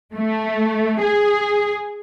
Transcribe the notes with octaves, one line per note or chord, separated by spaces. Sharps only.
A3
G#4